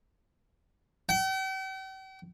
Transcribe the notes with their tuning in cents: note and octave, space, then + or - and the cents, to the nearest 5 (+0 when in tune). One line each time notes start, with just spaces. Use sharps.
G5 -45